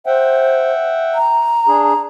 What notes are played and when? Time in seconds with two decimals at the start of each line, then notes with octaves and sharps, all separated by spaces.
0.06 C5 E5 F#5 G5
1.15 A#5
1.68 D4 G#4